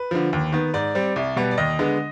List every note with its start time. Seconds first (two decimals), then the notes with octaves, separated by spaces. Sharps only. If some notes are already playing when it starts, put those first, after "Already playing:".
Already playing: B4
0.11 D3 F3
0.33 D#2
0.52 D#3 B3
0.74 G#2 D5
0.95 G3 C4
1.16 C2
1.36 B2 G3 B3
1.51 D5
1.58 D#2 D#5
1.79 D3 G#3 B3